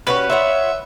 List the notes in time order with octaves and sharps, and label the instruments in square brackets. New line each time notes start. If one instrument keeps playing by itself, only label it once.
[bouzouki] C#4 F#4 G4 [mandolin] B4
[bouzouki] F4 C#5 F#5 [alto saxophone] E5